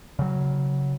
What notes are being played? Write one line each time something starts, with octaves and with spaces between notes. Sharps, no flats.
C#3 F#3